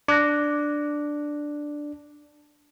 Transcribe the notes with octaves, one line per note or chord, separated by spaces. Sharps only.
D4 D6 F#6 A#6